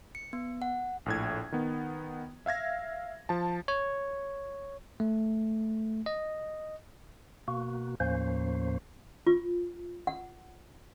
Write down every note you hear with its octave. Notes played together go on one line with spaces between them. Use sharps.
C#7
B3
F#5
A#1 A2 G#6
D#3 B3
E5 F5 G#6 A#6
F3 A5
C#5
A3
D#5
B2 A#3 F#4
D#2 A2 F3 A#3 C#4 C5
F4
F#5